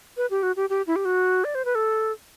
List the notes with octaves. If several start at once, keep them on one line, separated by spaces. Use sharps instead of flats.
B4
G4
F#4
G4
G4
E4
G4
F#4
D5
C5
B4
A4